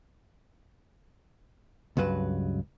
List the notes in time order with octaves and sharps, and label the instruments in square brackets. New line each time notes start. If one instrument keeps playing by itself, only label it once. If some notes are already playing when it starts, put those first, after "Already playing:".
[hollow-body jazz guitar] C#2 G2 F#3 B4